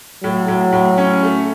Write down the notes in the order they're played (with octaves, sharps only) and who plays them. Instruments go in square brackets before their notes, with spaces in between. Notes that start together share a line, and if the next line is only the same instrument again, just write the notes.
[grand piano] A2 [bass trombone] F#3
[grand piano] A2
A2
C#4
A3